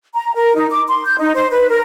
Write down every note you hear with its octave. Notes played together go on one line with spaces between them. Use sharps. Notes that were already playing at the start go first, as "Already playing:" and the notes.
A#5
A#4
D#4
D6
C6
G6
D#4
C5
B4
A#4